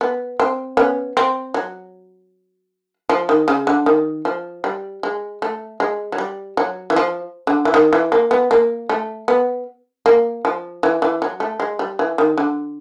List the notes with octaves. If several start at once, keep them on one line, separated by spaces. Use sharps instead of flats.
B3
C4
B3 C#4
C4
F#3
F3
D#3
C#3
D3
D#3
F3
G3
G#3
A3
G#3
F#3
G3
F#3
E3
F3
D3
E3
D#3
E3
A#3
B3
A#3
A3
B3
A#3
F3
E3
E3
F#3
A3
G#3
G3
E3
D#3
D3